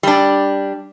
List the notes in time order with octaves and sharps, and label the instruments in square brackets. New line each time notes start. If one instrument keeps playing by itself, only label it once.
[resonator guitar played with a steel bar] G3 D4